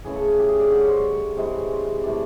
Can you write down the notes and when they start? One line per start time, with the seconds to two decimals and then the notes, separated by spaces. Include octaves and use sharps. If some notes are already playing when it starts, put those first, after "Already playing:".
0.05 C#3 E3 A3 G#4
0.16 A4
0.27 G#4
0.39 G4
0.49 G#4
0.60 D5
0.71 D3 G3 D5
0.80 C#5
0.87 C5
0.97 C#5
1.37 C3 E3 G#3
1.71 C5
2.03 C3 E3 A3 D5